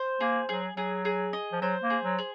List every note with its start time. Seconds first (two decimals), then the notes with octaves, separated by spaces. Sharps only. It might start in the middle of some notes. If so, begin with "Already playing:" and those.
Already playing: C5
0.20 A#3 G#4
0.49 F#3 G#4
0.76 F#3 G#4
1.05 G#4
1.33 D#5
1.52 F3
1.61 F#3 C5
1.83 A#3
1.90 G#4
2.03 F#3
2.18 G#4